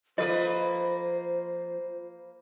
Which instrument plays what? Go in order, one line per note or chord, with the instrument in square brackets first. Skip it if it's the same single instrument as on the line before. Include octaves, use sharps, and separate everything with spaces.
[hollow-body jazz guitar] F3 [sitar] A#3 B4 [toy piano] A4 D#5 [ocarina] C5